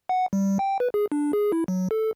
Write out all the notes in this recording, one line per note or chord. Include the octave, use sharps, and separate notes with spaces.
F#5
G3
G5
B4
G#4
D4
G#4
E4
F#3
A4